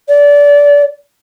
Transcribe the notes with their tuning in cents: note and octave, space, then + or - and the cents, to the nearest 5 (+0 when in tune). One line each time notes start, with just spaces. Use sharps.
D5 -25